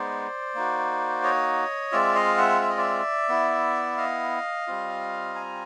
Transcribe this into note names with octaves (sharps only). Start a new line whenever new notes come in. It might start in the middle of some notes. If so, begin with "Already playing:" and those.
Already playing: G#3 B3 D#4 C5 D5
A#3 D#4 F#4
C#5 D#5
G#3 C4 F4 D5 E5
D#5 F5
E5 F#5
E5
D#5
D5 E5
B3 E4
D#5 F5
G3 C4 F4
G#5 A#5